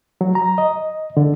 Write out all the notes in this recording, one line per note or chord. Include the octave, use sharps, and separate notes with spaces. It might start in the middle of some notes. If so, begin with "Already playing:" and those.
F#3
A#5
D#5
D3